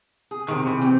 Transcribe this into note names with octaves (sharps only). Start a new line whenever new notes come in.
G#4
C3 D#3
C3 E3
C4